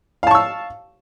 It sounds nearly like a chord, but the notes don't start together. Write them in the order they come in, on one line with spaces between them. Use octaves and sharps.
F5 A5 C#6 E6